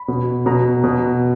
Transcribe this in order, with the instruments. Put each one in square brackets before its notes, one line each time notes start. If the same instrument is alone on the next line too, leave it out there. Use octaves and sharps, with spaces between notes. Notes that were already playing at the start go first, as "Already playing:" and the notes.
Already playing: [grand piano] B5
B2
B2 A#5
B2